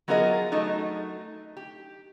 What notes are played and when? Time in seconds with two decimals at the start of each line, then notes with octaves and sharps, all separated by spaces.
0.08 F#3 B3 F4 G#4 A#4 D#5
0.52 F#3 A3 D#4
1.57 G4